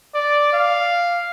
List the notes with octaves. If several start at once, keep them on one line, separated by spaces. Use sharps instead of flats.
D5
F5